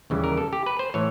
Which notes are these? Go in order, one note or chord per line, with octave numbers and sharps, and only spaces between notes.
D#2 C#3 E3 G3
A#4
A4
G4
B4
C5
A2 E3 C#5